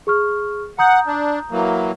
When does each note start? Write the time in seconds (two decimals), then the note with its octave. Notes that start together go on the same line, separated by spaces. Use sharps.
0.07 G#4 C#6 F6
0.79 F#5 A#5 D#6 G6
1.07 D4
1.51 E3 F#3 A#3